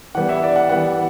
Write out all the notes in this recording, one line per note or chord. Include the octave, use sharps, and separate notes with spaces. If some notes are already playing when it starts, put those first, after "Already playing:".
E3 G3 B3 F#5
E5
D5
F#5
E3 G3 B3 F#5